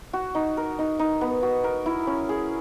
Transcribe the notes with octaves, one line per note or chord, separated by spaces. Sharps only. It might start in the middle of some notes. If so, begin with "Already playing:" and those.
F#4
D#4
A#4
D#4
D#4
B3
F#4
A#4
E4
C#4
G#4